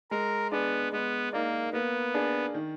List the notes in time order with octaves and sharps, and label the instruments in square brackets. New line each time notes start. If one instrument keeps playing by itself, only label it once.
[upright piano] G#3 [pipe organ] A#4
[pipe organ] B3 [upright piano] D4 G#4 D5
[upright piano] G#3 [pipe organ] B3
[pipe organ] A#3 [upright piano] D#4 A#4 D5
[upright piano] A#3 [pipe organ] B3
[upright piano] D4 G#4 D5
D#3